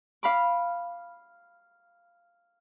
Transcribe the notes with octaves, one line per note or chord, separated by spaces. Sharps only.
F5 B5 D6